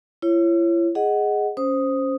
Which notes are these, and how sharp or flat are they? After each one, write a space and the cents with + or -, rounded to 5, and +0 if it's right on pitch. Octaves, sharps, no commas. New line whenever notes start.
E4 +45 C#5 -15
G#4 +0 D#5 +0 F#5 +5
C#4 +0 C5 +0 D#6 +0